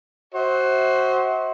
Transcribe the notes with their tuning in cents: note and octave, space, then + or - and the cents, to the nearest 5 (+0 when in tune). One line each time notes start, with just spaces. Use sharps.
F#4 +15 C5 +15 E5 -40